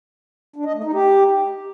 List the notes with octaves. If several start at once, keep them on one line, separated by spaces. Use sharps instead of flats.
D4
D#5
A3
D#4
G4